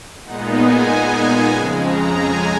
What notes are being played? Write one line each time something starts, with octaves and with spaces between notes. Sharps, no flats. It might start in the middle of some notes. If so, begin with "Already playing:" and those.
A#2 G#3 B3 D#4 F#5
G#5
F2 C#3 G#3 G#5
A#5
G#5